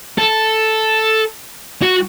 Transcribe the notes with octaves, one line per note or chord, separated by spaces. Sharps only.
A4
F#4